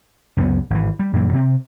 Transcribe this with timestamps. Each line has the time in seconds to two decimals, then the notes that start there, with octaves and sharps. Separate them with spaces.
0.37 C#2 F#2 G3 B3
0.70 G#1 E3
0.99 G3
1.13 F#2 A#2 E3 G3
1.33 C3 C4